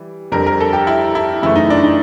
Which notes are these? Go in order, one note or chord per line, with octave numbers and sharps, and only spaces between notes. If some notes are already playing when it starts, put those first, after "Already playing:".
Already playing: E3 G3
F2 D3 G3 C4 A#4
A#4
A4
G4
E4
E4
F#2 C#3 E3 A3 E4
D#4
D4
D#4